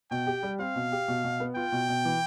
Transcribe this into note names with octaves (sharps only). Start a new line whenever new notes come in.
B2 G5
G4
G3
C4 F5
B2
G4
B2
B2
B3
F4 G5
B2
B2
E3